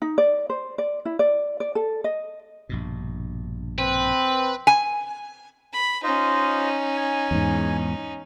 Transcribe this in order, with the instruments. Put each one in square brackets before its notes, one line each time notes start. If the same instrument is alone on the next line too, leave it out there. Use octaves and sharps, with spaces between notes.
[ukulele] D#4
D5
C5
D5
E4
D5
D5
A4
D#5
[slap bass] A#1 G2 B2
[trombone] C4 [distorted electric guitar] B4
[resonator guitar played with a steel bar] G#5
[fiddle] B5
[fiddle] C#4 D#4 [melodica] F4 C5 D#5
[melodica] G#5
[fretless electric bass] E2 G#2